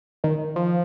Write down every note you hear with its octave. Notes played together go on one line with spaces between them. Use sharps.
D#3
F3